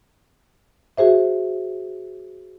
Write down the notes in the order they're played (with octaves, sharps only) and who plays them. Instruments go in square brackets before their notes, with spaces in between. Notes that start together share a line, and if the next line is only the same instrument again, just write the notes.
[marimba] F#4 G#4 C5 E5